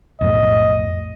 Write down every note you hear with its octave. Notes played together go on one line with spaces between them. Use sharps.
B1 F2 A2 D#5